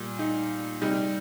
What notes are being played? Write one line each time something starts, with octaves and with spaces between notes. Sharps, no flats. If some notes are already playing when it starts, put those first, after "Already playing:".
Already playing: A#2 G3
D#4
C3 G3 D#4